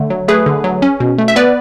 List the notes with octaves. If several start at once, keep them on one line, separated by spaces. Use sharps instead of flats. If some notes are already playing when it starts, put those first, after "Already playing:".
Already playing: D3 A3
F#3
A3 G#4 B4
D3
F#3
C#4
B2
A3
E5
B3 B4 D5